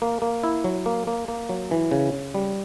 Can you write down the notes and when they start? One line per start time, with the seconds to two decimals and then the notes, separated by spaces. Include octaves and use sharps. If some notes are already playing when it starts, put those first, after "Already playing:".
0.02 A#3
0.22 A#3
0.43 E4
0.64 F#3
0.86 A#3
1.07 A#3
1.28 A#3
1.49 F#3
1.71 E3
1.91 C#3
2.13 C#3
2.34 G3